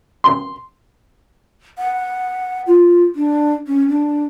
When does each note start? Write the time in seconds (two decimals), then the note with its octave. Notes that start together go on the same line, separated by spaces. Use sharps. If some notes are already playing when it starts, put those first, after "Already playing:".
0.24 C6
1.78 F#5
2.67 F4
3.15 D4
3.67 C#4
3.89 D4